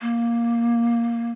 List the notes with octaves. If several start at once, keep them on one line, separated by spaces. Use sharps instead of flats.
A#3